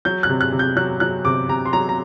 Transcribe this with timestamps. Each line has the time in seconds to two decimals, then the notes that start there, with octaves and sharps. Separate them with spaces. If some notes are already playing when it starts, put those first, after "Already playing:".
0.05 F#3 G6
0.23 F#6
0.29 C3
0.41 F#6
0.52 C3
0.59 G6
0.76 F#3 F#6
1.00 F#3 F#6
1.25 C3 D6
1.49 C3 A#5
1.66 C6
1.73 F#3 A#5
1.89 A#5